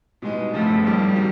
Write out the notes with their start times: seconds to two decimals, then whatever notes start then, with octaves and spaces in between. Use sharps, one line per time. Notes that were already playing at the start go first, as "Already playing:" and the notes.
0.22 B2 G3 G#3 B3 D#4
0.53 G1 F2 C#3 F3 A3
0.84 A#1 G#2 F3 G3 A#3
1.15 C3 D#3 F#3